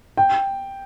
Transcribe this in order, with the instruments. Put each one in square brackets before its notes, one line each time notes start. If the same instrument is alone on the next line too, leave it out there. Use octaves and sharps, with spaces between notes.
[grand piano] G5